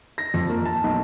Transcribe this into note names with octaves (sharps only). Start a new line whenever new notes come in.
A#6
F2
A#3
A5
B1